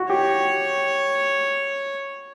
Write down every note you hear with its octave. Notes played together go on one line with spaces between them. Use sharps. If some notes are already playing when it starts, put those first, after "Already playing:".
Already playing: F#4
G4 C#5